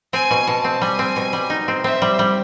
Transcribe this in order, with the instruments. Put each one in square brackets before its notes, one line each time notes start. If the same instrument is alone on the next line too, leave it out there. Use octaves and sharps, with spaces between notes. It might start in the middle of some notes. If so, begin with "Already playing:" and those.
[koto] C4 [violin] G#5
[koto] B2
[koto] B2 [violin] A5
[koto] C4
[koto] G3 [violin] G#5
[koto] C4
B2
G3
D#4
C4
[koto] C4 [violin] E5
[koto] G3
G3